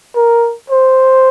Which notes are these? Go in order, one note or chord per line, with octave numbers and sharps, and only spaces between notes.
A#4
C5